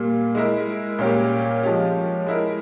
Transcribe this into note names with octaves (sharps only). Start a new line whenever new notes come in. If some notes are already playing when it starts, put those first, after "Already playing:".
Already playing: A#2 G3 A#3
G#3 E4 A#4
A#2 G3 C#4 G4 A#4
F3 G#3 C#4 G4
G#3 E4 A#4